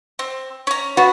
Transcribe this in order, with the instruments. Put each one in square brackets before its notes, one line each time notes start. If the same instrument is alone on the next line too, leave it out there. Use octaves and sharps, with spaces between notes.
[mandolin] C4
C#4 A#5
[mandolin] B3 [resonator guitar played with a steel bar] F#4